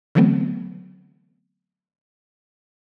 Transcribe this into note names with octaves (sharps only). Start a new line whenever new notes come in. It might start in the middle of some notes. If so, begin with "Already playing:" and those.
D3 E3 F#3 A3 B3 C4